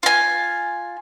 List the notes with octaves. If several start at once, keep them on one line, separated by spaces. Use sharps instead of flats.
F4 G#5